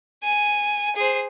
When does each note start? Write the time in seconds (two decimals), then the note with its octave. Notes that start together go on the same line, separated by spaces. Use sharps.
0.23 G#5
0.96 G#4 C5